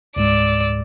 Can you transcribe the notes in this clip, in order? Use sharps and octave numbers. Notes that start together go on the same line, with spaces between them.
C#2 G#2 G#3 D5 E6